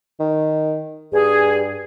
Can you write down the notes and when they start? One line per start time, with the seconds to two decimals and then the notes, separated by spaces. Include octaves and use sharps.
0.20 D#3
1.13 G2 G#4